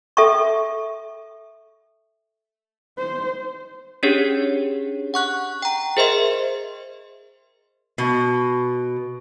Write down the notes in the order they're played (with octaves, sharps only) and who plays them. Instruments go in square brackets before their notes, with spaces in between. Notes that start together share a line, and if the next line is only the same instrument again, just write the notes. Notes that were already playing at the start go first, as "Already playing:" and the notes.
[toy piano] A4 E5 G5 A5 C#6
[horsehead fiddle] C5
[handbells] C#4 D4 G4 G#4 C#5
F#5 C#6 F#6
G5 A#5
G#4 A#4 C5 D#5 E5 C6
[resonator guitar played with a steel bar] B2